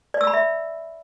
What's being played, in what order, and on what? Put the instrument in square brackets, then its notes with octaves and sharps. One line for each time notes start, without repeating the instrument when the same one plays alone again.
[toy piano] D5
E6
B5
E5